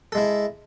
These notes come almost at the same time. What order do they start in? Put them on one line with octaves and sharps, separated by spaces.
A4 G#3 E4